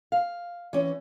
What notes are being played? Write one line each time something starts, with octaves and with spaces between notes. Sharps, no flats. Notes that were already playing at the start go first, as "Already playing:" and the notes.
F5
E3 C#4